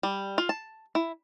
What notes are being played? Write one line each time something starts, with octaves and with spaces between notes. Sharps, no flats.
G3
F4
A5
E4